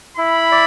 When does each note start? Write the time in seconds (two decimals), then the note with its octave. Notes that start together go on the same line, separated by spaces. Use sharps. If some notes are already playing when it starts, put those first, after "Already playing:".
0.17 E4 B5
0.52 D5